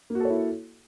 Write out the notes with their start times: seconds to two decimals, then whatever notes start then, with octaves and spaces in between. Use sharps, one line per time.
0.10 A#3
0.15 F#4
0.20 A4
0.25 C#5
0.30 E4